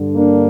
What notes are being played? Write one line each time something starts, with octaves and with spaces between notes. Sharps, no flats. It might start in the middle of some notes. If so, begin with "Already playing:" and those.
Already playing: G2 D3
A#3 D4